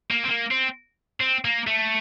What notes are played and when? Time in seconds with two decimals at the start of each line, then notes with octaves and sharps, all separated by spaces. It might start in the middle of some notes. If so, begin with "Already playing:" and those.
0.11 A#3
0.24 C4
0.28 A#3
0.51 C4
1.20 C4
1.45 A#3
1.67 A3